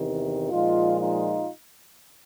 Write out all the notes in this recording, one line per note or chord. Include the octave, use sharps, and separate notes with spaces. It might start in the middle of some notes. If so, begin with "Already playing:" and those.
Already playing: E2 C3 D#3
A#2 F3 G#3 D#4 F4
D#4 F4